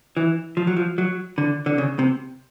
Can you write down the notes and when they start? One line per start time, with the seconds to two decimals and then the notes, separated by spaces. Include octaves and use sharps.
0.17 E3
0.57 F3
0.67 F#3
0.77 F3
0.98 F#3
1.38 D3
1.66 D3
1.78 C#3
1.99 C3